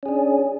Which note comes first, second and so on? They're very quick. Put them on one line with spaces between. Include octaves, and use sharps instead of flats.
C#4 G#4 D4